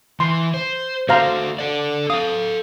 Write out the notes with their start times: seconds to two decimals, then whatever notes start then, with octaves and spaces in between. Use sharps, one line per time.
0.20 E3 C6
0.54 C5
1.09 A3 F#4 C5 F5 A#5
1.59 A4 D5
2.10 A4 F5 D#6